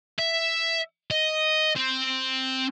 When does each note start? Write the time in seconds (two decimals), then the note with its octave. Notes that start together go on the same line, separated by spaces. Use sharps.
0.19 E5
1.11 D#5
1.76 C4